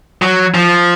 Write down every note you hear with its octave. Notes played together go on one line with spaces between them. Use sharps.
F#3
F3